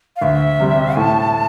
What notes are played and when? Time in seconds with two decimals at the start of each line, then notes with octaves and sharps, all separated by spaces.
0.16 F5
0.22 D2 E5
0.60 C3 G3 C4
0.97 A2 A5